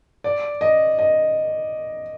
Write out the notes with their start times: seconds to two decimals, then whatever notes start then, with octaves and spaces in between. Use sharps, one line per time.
0.24 D5
0.61 D#5
0.99 D#5